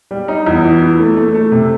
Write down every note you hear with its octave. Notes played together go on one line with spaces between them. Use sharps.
G3
D#4
E2
E3
E3
A3
A3
A3
C3